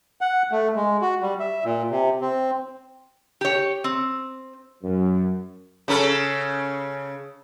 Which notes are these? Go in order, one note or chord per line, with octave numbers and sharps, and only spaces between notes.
F#5
A3
G#3
F#4
G3
E5
A#2
C3
C4
G4 C#5
C4
F#2
C#3 C#4 A4